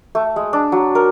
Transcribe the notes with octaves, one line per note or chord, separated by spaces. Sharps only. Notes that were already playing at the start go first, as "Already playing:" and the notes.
A3
G#3
D4
F#3
A#4